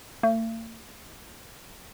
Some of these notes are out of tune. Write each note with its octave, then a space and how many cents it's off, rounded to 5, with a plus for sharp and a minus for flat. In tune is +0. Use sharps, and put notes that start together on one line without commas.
A3 +45